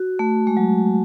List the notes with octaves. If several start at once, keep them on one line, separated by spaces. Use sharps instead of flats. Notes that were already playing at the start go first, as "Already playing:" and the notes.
Already playing: F#4
A3
G#3
F#3